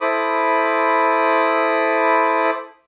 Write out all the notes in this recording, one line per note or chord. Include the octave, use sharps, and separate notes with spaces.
E4 A4 C5 B5 D6 D#6